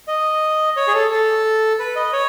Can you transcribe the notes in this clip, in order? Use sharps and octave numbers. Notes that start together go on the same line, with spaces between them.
D#5
C#5
G#4
A4
A4
B4
D#5
C#5